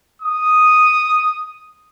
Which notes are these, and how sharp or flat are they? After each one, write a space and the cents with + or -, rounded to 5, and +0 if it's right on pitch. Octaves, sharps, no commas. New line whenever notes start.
D#6 +0